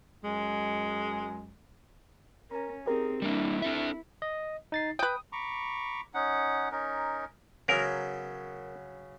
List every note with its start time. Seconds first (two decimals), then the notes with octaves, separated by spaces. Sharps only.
0.25 F#2 G#3
2.51 C#4 A#4 G#5 A#5
2.86 C4 D#4 G4 G#4 A#4
3.22 G3 A#3 D4 E4
3.62 C4 D4 A4 E5
4.22 D#5
4.72 D#4 A6 C7
4.99 B4 G5 D#6
5.32 A#5 B5 C#6 D6
6.14 C#4 D#4 F#5
6.72 C#4 D#4 A#4
7.68 C#3 F#3 B3 A#4